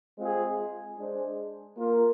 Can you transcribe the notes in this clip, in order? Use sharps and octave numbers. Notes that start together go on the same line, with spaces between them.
G#3 C4 F4 G#4
G#3 D4 G#4 C5
A#3 F4 A#4